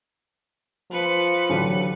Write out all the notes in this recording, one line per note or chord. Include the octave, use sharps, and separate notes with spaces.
F3 B4 C#7
A1 D3 F#3